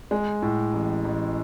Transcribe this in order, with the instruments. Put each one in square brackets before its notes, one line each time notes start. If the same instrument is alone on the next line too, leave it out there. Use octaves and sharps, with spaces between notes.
[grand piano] G#3
A2
A1
A1